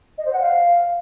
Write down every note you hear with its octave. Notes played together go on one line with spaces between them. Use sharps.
D#5
C5
F#5
F5